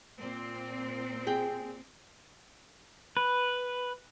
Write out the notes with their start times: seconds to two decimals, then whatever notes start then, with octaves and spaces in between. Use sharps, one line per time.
0.17 A#2 C4
1.27 G4 G#4 G5
3.17 B4